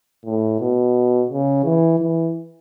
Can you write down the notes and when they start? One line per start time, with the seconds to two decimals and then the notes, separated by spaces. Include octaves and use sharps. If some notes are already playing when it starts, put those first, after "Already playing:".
0.25 A2
0.60 B2
1.30 C#3
1.65 E3
1.99 E3